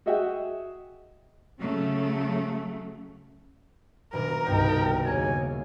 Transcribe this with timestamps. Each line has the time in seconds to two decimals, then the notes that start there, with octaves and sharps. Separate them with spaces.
0.06 F#4 G#4 D#5 E5 F#5 G5
1.60 C#3 F#3 A3
4.13 D#1 B2 D4 A#4 A#5
4.46 C2 G2 B2 D#4 G5
5.05 D#2 C#3 F#4 C#5 G#5